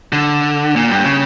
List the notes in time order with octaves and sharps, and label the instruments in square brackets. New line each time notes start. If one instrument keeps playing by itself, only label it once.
[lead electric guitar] D3
A#2
G2
C#3